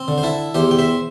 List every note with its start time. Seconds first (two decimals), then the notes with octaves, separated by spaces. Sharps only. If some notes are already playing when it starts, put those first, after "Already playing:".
Already playing: C4
0.08 D3
0.18 C5
0.23 E4 A4
0.54 E2 G4 C5
0.71 G5
0.79 C5 E5